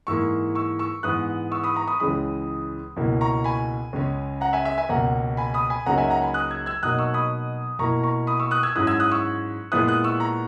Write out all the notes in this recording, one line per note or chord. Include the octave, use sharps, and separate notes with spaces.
G#2 E3 A#3 E4 C#6 E6
C#6 E6
C#6 E6
G#2 E3 B3 D#6 F#6
C#6 E6
B5 D#6
A#5 C#6
B5 D#6
C#2 C#3 E3 G#3 B5 D#6
C#2 B2 A#3 E4
A#5 C#6
G#5 B5
C#2 C#3 G#3 C#4
F#5 A#5
E5 G#5
E5
E5 G#5
C#2 B2 A#3 F#5 A#5
G#5 B5
B5 D#6
G#5 B5
C#2 C#3 F#3 A#3 D#4 F#5 A#5
E5 G#5
F#5 A#5
G#5 B5
D#6 F#6
E6 G#6
E6 G#6
B2 F#3 A#3 D#4 D#6 F#6
C#6 E6
B5 D#6
B2 A#3 E4 A#5 C#6
A#5 C#6
B5 D#6
C#6 E6
D#6 F#6
E6 G#6
G#2 F#3 C#4 E4 D#6 F#6
E6 G#6
D#6 F#6
C#6 E6
A#2 G#3 B3 E4 D#6 F#6
D#6 F#6
C#6 E6
A#5 C#6